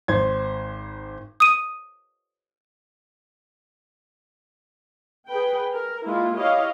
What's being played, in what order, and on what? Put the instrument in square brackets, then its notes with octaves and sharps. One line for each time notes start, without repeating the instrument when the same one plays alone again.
[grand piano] G#1 C5 G#6
[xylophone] D#6 D#7
[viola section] G#4 B4 G5
A#4
G#3 A#3 E4 F4
E4 G4 C#5 D#5 F5